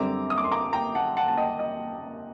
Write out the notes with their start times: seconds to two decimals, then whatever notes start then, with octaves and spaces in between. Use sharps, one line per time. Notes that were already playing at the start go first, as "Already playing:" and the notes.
Already playing: F#2 D3 G3 C4 A#5 D6
0.30 D#6
0.38 D6
0.44 C6
0.52 A#5 D6
0.73 G5 A#5
0.95 F#5 A5
1.17 F#5 A5
1.28 A5
1.37 D#5 G5
1.59 D#5